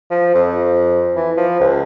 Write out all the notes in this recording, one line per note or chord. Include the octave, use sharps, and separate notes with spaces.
F3
F2
E3
F3
C#2